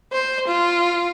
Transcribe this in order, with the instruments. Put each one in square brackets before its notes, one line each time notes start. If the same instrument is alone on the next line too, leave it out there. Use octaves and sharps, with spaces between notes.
[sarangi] C5
F4